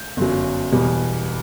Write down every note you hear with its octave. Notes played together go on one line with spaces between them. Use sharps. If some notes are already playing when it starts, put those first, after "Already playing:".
Already playing: G6
G1 F#2 F#3
E1 E2 B2 G3